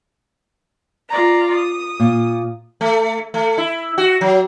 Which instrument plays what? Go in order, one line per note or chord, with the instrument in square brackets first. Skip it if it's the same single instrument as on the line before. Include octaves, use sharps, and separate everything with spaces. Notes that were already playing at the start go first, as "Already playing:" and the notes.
[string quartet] F4 D5 A#5
D#6
[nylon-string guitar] A#2
[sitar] A3
A3
E4
F#4
F#3